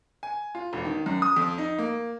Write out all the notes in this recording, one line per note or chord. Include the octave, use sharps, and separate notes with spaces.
G#5
F4
E1
D#3
F#2
D#6
F2
D#4
A#3